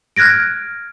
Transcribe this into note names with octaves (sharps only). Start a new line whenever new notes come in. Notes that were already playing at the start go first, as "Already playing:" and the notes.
F6 F#6 G#6 A#6 D7